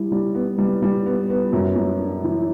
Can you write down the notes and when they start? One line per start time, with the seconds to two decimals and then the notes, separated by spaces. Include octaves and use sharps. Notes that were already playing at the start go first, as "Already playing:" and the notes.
Already playing: G3 E4
0.12 G3
0.34 B3
0.58 G3
0.82 G3
1.06 B3
1.30 B3
1.53 F#2
1.76 F#2
2.00 D4
2.24 E3